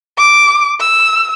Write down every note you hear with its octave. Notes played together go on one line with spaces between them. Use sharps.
D6
E6